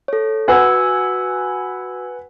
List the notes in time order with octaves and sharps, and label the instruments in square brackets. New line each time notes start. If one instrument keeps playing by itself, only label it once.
[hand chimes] A4 C#5
[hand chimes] F#4 E6 G#6 [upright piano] B4 F#5 G#5